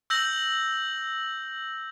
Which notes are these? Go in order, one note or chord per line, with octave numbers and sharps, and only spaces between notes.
E6 G6 A#6 F#7